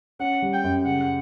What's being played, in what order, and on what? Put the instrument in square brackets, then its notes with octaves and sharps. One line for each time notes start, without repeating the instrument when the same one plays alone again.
[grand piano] C#4 [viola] F#5
[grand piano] G3
[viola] G5
[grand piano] F#2
[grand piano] C#3 [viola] F#5